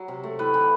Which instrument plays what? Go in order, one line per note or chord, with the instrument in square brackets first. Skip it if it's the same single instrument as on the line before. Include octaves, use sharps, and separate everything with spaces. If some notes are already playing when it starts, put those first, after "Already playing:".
Already playing: [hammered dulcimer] F#3
C3
A3
A2 B4
E3